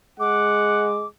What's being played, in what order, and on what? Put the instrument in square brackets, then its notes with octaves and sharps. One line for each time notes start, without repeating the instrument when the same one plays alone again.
[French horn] G#3 [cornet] F#5 [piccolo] D6